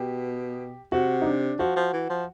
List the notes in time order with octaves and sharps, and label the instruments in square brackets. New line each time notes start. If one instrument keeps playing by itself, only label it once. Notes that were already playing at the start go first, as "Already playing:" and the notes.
Already playing: [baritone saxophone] B2 [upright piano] G4
[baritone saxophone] C3 [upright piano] F#4
[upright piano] D#4
D4
[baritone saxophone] F3 [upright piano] F#4
[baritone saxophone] F3
E3
F3